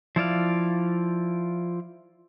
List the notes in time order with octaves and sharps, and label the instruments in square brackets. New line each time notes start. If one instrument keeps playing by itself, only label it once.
[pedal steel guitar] F3 E4 D5 F5